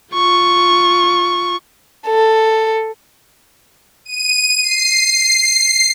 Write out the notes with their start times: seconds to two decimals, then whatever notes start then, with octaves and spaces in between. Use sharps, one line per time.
0.13 F4 C#6
2.08 A4
4.05 D#7
4.62 C7